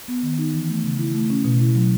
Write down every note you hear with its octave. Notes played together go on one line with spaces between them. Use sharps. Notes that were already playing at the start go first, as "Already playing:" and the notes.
B3
D#3
D#4
E3
A3
C#3
E4
A3
C#4
B2
E4
F#3